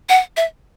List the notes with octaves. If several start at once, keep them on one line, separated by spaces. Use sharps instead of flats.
F#5
E5